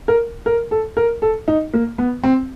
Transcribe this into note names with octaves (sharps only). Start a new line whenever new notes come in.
A#4
A#4
A4
A#4
A4
D#4
A#3
B3
C4